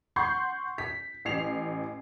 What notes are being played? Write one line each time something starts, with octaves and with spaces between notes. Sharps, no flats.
F#5 C6 C#6 G6 C7
B6
A1 C7 F7